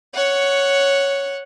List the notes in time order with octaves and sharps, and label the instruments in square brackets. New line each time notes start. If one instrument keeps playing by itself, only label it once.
[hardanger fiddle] C#5 F#5